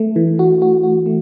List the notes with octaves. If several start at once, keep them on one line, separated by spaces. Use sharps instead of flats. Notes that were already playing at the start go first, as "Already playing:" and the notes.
Already playing: A3
E3
F#4
F#4
F#4
A3